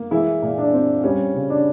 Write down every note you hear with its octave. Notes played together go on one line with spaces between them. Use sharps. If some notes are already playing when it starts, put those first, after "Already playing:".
Already playing: A#3
E3 G#3 E4
A#2
D4
C4
G3 C#4
C#3
D4